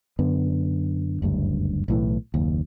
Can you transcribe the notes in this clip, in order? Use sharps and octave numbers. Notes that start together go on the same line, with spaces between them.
F#2 D3 B3
F#1 D2 G2
B1 A2 E3
F#1 D#2